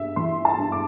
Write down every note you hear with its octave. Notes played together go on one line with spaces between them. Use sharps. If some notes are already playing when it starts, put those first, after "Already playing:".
Already playing: G2 E5
E3 C6
A5
G2
D6